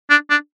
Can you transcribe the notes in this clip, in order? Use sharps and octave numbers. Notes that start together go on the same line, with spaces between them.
D4
D4